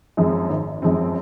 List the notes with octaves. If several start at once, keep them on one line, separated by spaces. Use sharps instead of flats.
F#2 F3 G#3 C4
G#1
F#2 F3 G#3 C4